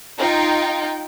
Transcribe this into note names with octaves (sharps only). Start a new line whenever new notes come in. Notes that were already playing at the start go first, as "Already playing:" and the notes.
D#4 F4 G5